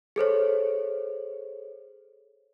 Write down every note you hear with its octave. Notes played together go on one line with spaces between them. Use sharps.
G#4 A4 C5 C#5